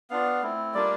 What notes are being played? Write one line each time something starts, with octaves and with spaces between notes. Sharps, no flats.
B3 D4 F4 F5
A3 C4 E4
G3 A#3 D4 F4 D5